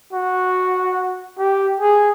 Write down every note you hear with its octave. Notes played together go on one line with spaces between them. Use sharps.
F#4
G4
G#4